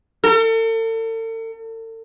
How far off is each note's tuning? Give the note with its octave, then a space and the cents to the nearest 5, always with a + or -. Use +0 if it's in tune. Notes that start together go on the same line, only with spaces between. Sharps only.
A4 +40